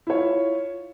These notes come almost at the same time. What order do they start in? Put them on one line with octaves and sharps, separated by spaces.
E4 C#5 F4